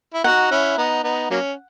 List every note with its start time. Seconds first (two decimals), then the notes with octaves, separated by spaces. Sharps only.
0.14 E4
0.24 D#4 F#4 F#5
0.51 C#4 E4
0.78 B3 D#4
1.03 B3 D#4
1.31 F#3 A#3 C#4